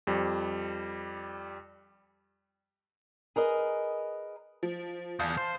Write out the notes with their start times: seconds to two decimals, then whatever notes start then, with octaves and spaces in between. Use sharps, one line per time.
0.07 F2 G3
3.36 G#4 A#4 B4 D#5
4.63 F3
5.20 E2 F5 A5 G6
5.38 C5